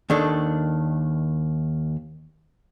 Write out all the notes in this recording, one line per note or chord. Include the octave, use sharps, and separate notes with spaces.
D#2 D#3 D4 A4